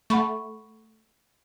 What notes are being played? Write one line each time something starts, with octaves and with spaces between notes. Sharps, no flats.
A3 F#5 B5 C#6